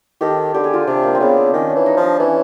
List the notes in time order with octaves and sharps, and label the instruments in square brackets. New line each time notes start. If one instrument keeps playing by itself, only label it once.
[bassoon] D#3 [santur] G4 A4
[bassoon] D3 [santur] G4
[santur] G#4
F4 G4
[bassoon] C3 [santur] D4
[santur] A#3
C4
[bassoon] C#3 [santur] B3
[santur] C4
[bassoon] D#3 [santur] C#4
[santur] D4
[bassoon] E3
[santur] D#4
[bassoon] F3
[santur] D4
[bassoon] E3 [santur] C#4